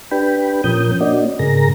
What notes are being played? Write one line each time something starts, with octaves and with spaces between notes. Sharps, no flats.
D4 G4 B4 G5 B5
A#2 F3 C#4 A#4 D#6 G6
A#3 C#4 D4 F#4 D5 D#5
G#2 C#3 G#4 A#4 A#5 A#6